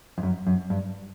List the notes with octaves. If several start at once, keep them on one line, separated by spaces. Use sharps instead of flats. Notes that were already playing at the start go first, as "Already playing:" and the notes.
F2
F#2
F#2
G2